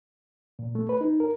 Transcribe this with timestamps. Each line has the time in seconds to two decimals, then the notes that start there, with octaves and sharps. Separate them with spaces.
0.59 A#2
0.75 A3
0.89 B4
1.01 D#4
1.20 A#4